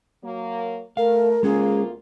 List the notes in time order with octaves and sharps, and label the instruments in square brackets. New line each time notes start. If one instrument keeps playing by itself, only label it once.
[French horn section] F#3 A#3
[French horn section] A3 [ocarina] A#4 [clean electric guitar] F5
[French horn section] D2 A#3 F4 [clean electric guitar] G#3 C#4 [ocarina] G#4